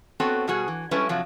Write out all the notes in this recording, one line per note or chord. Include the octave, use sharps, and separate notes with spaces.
B3 C4 F#4 A4 C#5 G5
B2 G3 F#4 G#4
E3
G3 G#3 C#4 E4 A4 B4
C3 F3 F#3